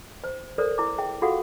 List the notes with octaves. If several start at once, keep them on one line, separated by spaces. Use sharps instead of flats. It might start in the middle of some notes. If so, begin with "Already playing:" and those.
C5
A4 A#4 C5 D5
E4 D6
G#4 E5 G5
F4 F#4 G#4 A4 F5 F#5